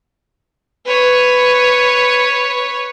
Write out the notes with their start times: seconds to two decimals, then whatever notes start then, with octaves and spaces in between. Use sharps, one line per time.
0.86 B4 C#5